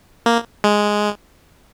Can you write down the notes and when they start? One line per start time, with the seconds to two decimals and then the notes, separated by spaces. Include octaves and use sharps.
0.26 A#3
0.64 G#3